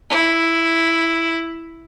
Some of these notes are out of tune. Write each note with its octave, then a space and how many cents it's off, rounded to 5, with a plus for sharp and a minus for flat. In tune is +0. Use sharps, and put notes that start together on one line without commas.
E4 +0